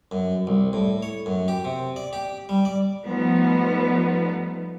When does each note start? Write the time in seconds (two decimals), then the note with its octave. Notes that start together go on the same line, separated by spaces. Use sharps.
0.11 F#2
0.47 C2
0.73 A2
1.03 C#5
1.26 F#2
1.48 G4
1.64 C3
1.96 D5
2.13 G4
2.49 G3
2.65 D5
3.05 F3 G3 A3 B3 D#4 B4